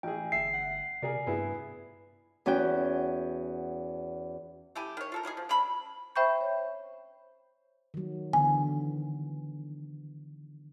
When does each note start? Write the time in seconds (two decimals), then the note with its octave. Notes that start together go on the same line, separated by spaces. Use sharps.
0.03 A1 G#4 G5
0.32 G1 E5 C7
0.54 F#5
1.02 C3 G#4 A#4 D5
1.27 G2 B3 E4 G#4
2.46 E2 C#4 F#4 G5
4.75 A3 E4 G4 G#5
4.97 D#3 C#5
5.12 F4 A4 A#4
5.23 E3 F#3 D#4 G#4
5.37 F3
5.49 D3 C#4 A4 B5
6.16 C5 E5 G5 B5 C#6 G6
6.41 C#5
7.94 D#3 F#3
8.33 D3 E3 B3 G#5